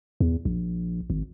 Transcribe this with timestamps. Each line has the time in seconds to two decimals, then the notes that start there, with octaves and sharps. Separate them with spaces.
0.20 E2
0.45 A#1
1.10 G#1